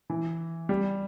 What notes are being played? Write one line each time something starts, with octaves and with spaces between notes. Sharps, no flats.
E3
G3